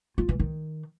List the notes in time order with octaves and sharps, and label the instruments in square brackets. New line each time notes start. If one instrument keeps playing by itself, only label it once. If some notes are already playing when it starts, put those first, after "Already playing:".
[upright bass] F4
E3
D#3